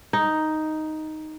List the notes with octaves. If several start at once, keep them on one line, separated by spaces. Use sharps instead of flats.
D#4